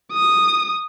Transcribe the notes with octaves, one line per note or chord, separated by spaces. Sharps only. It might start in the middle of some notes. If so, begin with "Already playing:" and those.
D#6